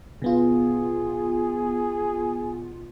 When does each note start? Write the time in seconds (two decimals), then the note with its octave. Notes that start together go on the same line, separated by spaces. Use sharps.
0.22 B2 B3 F4 G#4